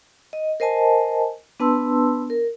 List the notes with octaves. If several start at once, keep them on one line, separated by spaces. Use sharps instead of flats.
D#5
A#4 C5 D#5 G#5 A5
B3 D4 B4 A5 C6 E6
A#4